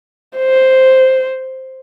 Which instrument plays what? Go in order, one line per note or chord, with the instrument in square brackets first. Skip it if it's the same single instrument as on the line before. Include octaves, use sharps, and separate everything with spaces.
[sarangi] C5